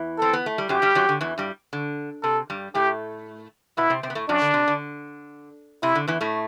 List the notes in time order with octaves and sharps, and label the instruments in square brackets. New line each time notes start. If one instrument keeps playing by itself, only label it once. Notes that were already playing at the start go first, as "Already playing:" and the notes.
Already playing: [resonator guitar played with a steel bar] E2 E3
[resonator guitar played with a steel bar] C4 [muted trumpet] A4
[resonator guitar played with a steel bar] B3
A3
G3
[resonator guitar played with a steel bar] F#2 F#3 [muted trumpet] G4
[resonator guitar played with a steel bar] G2 G3
F#2 F#3
D3
E2 E3
G2 G3
D3
[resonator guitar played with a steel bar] C3 [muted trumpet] A4
[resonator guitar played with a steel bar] G2 G3
[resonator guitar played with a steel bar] A2 A3 [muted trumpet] G4
[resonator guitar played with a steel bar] B2 B3 [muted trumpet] E4
[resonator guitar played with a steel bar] C3 C4
C3 C4
B3
A2 A3
[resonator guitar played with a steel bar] F#2 F#3 [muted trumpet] D4
[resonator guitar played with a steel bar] D3
C3
D3
[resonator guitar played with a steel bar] C3 [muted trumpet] E4
[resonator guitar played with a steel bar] D3
E2 E3
A2 A3